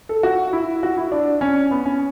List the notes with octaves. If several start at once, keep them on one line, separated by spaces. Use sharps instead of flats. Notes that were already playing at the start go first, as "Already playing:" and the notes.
A4
F#4
E4
F#4
E4
D4
C#4
B3
C#4